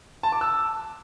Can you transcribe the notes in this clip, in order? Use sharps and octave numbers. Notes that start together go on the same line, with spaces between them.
A5
D6
E6